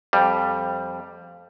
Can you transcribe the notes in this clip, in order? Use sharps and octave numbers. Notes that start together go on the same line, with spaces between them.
F2 G3